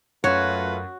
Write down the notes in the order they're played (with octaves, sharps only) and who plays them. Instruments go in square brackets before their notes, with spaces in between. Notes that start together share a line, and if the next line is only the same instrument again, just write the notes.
[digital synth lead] F#2 [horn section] A3 F4 B4 [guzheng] F#4 [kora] C#5